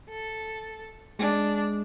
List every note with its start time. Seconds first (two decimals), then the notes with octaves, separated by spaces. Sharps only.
0.11 A4
1.19 G#3 D4